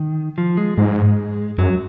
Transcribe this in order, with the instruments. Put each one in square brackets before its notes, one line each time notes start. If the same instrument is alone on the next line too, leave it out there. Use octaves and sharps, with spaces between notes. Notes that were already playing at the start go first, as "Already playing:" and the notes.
Already playing: [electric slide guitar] D#3
F3
G#3
[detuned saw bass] G#2 [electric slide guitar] G#3
[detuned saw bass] F#2 [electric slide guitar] F#3